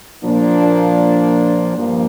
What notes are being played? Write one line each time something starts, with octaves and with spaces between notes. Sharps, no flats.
A#2 F3 A#3 D4
G2 F3 A#3